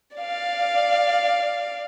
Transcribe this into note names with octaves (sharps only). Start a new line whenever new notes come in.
D5 F5